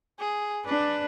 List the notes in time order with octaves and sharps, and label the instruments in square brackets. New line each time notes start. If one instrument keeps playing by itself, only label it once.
[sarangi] G#4
[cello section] D4 [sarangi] B4